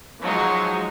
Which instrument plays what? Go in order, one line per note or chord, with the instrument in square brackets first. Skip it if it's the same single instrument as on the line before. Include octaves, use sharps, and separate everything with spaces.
[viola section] F3 F#3 G#3 D#4